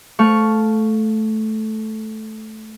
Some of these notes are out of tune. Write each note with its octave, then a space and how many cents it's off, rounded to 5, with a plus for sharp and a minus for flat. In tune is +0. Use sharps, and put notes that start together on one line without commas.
A3 -10 F5 +0 C#6 +0